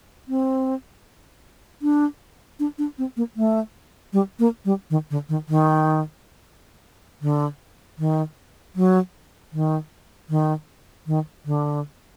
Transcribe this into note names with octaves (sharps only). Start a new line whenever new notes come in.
C4
D4
D4
D4
C4
A#3
A3
G3
A#3
G3
D#3
D3
D#3
D#3
D3
D#3
F#3
D#3
D#3
D#3
D3